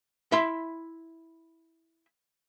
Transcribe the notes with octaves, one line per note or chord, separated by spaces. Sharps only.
E4 E5 C6